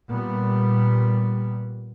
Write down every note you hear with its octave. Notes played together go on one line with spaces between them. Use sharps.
A#2 G3 B3